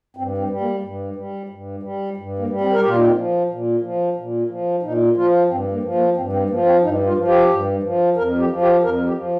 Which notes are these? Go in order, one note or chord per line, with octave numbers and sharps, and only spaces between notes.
G2 C4
C4
G3
A#3
G2
G3
G2
G3
G2
A#3
G3
C4
A#4
A#2 G4
F4
D#4
C4
F3
A#2
F3
A#2
F3
A#2 D#4
F3 F4
G2 C4
A#3
F3
A#3
G2 C4
C4
F3 A#3
C4
G2 D#4
F4
F3
G4
G2
F3
F2 A#4
G4
F3
G4
F2 A#4
G4
F3